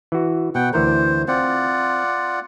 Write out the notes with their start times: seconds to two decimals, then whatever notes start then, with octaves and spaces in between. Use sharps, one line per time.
0.12 E3 F#4
0.55 B2 B3 F#5 G5
0.73 D2 E3 A#4 C5
1.28 C4 F4 D5 F#5